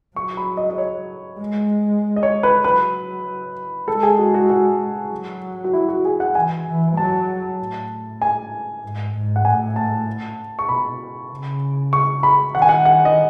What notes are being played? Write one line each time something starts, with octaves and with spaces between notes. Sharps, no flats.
F#3 C#6
B5
D#5
D#5
C#5
G#3
D#5
C#5
B4
F#3 B4
G#3 A4
G#4
F#4
F#4
F#4
F#3
F#4
E4
F#4
G#4
F#5
E3 G#5
E3
F#3 A5
A2
G#5
G#2
G#2
F#5
A2 G#5
A5
C#6
B2 B5
C#3
C#6
B5
D#3 F#5
G#5
F#5
F#5
D#5